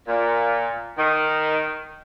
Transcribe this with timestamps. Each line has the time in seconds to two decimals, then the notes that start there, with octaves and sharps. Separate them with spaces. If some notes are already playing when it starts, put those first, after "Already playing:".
0.08 A#2
0.98 D#3